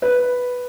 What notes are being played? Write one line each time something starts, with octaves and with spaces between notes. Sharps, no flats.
B4